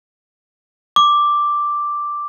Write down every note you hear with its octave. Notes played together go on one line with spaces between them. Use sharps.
D6